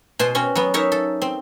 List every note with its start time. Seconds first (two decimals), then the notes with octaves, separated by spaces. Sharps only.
0.19 B2 C5 G#5
0.35 C4 C#4 F#4
0.56 F#3 B3
0.74 D#4 A#4 C#5 E5
0.92 A4
1.22 C4